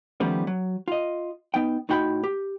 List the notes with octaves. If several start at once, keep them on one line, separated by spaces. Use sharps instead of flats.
D#3 F3 G3 A3 B3 C#4
F#3
F4 D#5
B3 D#4 G5
A2 D#4 F#4 G5 B5
G4